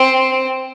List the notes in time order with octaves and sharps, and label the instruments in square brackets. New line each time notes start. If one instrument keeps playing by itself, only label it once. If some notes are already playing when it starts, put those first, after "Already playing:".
Already playing: [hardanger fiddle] C4